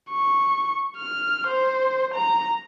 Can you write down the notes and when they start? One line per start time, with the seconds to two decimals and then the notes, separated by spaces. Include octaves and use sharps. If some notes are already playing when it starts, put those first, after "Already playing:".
0.11 C#6
0.97 F6
1.47 C5
2.14 A#5